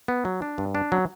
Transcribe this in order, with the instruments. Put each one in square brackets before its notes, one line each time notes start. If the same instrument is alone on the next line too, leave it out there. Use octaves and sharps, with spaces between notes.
[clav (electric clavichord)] B3
F#3
D4
G2
D4
F#3